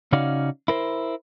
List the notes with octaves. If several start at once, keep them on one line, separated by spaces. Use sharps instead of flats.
C#3 C#4 D#4 F#4 D5 F5
E4 A#4 C5